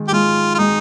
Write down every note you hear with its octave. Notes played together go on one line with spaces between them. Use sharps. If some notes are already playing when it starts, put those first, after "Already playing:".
Already playing: D#3 G#3
G4
G#3 F4
F4
G#3 D#4